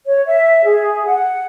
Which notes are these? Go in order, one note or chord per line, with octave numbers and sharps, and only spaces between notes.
C#5
E5
G#4
F#5